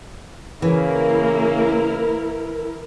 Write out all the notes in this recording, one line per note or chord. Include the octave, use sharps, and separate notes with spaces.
C#3 E3 A#3 E4 A#4